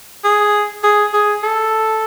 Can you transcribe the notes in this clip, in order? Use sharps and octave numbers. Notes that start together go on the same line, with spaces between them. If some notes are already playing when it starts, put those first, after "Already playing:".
G#4
G#4
G#4
A4